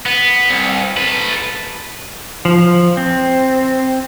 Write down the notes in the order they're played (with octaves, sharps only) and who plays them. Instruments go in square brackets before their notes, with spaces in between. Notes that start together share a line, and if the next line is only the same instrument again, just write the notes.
[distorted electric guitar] B3
C2
A4 B4
[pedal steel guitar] F3
C4